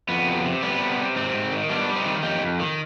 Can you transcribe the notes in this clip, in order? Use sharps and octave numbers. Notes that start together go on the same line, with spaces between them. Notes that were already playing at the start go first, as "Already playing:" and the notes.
F2 B3
C3
C3
G3 B3
C3
C3
G#2 C4
G#2
D#3
G3 B3 D4
G3
C4 D#4
D#3
F2 D#4 G4
F2
D#3